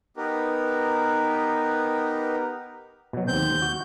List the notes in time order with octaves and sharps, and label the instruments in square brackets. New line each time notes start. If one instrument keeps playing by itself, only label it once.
[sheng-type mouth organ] B3 D#4 G4 A#4 B4
[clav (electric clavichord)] B2 F#3
[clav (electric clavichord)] D#2 C4 [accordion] G6
[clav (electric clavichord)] F#4